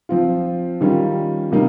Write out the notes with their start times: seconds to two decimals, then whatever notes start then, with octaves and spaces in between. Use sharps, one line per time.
0.09 F3 C4 F4
0.81 D#3 G3 C#4 F4
1.52 C3 G3 A#3 D#4